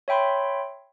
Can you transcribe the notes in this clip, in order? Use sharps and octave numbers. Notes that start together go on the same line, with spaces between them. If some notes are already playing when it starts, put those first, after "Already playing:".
C#5 E5 G5 B5 C6